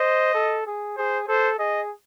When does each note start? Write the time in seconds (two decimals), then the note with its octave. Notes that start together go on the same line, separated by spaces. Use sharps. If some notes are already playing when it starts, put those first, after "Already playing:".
Already playing: C5 D#5
0.34 A4
0.66 G#4
0.97 G#4 C5
1.28 A4 C5
1.59 G#4 D#5